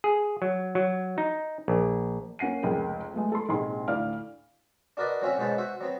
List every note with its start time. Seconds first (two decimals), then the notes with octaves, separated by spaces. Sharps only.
0.04 G#4
0.42 F#3
0.75 F#3
1.18 D#4
1.68 A#1
2.39 A#3 C#4 F#5 C7 D#7
2.63 F1 C#2 G#4 A#4 G5
3.13 G#3 A3 B3
3.32 A4 C6
3.49 A#1 G#2 C3 D#4 G#4 C6
3.88 D2 A2 D5 F5 F6
4.97 D4 F#4 A#4 B4 D5 D#5
5.22 F#3 C4 C#4 F4 F#4 E5
5.38 G#2 B2 C#4 B4 C5 A5
5.58 F#4 C5 E5 F#5
5.81 F#3 B3 C4